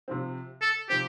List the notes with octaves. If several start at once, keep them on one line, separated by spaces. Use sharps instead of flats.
C3 F3 C4
A4
C3 F3 C4 G4